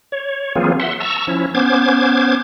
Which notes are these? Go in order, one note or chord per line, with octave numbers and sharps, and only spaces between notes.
C#5
E3 F#3 A#3 C4 F4 G#4
E5 F#5 C6
A5 A#5 C#6 E6
F3 C#4 E4
B3 C#4 C5 D6 G#6